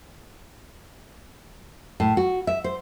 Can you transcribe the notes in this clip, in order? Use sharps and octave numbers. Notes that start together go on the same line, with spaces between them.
A2
F#4
E5
C5